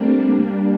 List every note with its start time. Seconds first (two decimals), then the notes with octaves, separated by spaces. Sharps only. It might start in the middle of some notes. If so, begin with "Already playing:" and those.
Already playing: G3 A3 A#3 C4 D4